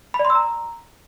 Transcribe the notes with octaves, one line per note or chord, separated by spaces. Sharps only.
B5
D5
C6
E6
A#5